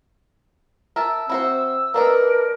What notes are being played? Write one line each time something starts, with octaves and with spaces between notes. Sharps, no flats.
A#4 E5 A5 E6
C4 E4 F#4 C5
A#3 D4 D#4 A#4 B4